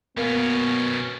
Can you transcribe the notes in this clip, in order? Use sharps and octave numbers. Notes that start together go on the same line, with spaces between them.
B2 A#3 B3 C#4